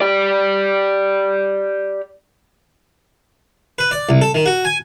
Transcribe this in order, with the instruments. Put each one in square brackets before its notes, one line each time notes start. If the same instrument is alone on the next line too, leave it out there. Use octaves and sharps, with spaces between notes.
[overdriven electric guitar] G4 D5
[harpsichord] B4
D5
C2
A4
D#3
F#4
G#5